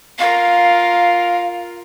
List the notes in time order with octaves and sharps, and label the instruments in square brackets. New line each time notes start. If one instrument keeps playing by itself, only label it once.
[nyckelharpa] F4 A#4 [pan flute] F5